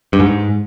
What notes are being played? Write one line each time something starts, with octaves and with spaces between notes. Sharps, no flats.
G2
G#2